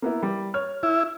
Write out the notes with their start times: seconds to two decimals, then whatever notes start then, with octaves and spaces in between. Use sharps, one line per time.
0.02 A#3 B3 E4
0.23 G3
0.54 C#5 F6
0.83 E4